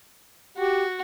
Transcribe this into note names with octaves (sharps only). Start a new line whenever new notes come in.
F#4 G4